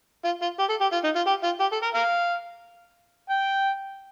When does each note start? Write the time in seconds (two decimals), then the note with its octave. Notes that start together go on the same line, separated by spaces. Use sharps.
0.24 F4
0.42 F4
0.59 G4
0.69 A4
0.81 G4
0.92 F4
1.04 D#4
1.15 F4
1.27 G4
1.44 F4
1.60 G4
1.72 A4
1.83 A#4
1.95 A#4 F5
3.30 G5